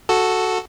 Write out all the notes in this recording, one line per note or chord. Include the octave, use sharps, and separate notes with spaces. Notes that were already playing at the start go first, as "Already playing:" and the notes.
F#4 A4